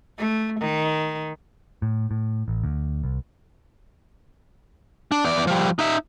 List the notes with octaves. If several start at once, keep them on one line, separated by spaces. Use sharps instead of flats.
A3
D#3
A2
A2
A1
D2
C2
D4
E2 D5
F3 G3
D#4 E5